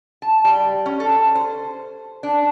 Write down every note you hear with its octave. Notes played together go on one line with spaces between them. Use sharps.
A5
G3
C#4
A4
C5
D4